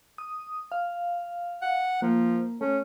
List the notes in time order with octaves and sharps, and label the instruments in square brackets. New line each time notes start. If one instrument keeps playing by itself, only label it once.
[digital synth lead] D#6
F5
[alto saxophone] F#5
[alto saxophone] F3 [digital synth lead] A#3
[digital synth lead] A3 [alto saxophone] C#4